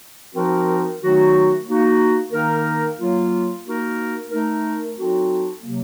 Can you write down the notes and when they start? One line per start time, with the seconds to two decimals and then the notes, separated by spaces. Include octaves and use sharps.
0.34 F3 C4 D#4 F#4 A#4
1.01 D#3 F#3 A3 D#4 F#4
1.66 A#3 D#4 F#4
2.32 D#3 A#3 D#4 A#4
2.98 F#3 A#3 F4
3.64 A#3 D#4 F#4 A#4
4.29 A3 D#4 A#4
4.96 F#3 C4 D#4 F#4 A4
5.61 C3 F#3 A#3